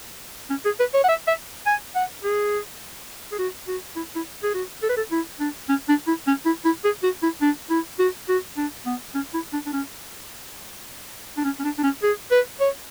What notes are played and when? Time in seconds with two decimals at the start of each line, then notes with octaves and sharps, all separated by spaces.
0.50 C#4
0.65 G#4
0.80 B4
0.94 C#5
1.04 F#5
1.09 E5
1.28 E5
1.66 G#5
1.95 F#5
2.24 G#4
3.32 G#4
3.39 F#4
3.68 F#4
3.96 E4
4.16 E4
4.43 G#4
4.54 F#4
4.83 A4
4.90 B4
4.97 A4
5.12 E4
5.40 D4
5.69 C#4
5.89 D4
6.07 E4
6.27 C#4
6.46 E4
6.65 E4
6.84 G#4
7.03 F#4
7.23 E4
7.41 D4
7.70 E4
7.99 F#4
8.29 F#4
8.57 D4
8.86 B3
9.15 C#4
9.34 E4
9.53 D4
9.66 D4
9.73 C#4
11.37 D4
11.45 C#4
11.59 C#4
11.64 D4
11.78 D4
11.84 C#4
12.03 G#4
12.31 B4
12.60 C#5